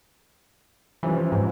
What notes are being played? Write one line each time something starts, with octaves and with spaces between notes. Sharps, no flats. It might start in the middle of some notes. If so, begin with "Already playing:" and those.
C3 E3 F3 C#4
G#2